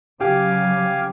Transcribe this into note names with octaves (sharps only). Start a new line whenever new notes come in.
C#3 F#3 G4 F5 G#5 D6